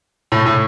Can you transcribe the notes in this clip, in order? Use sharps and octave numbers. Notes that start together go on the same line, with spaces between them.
A2
A2